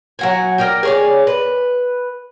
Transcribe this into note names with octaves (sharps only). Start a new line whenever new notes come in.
F#3 F#5 G#5
A#4 D5 D#5 G5
G#4 C#5 D5
B4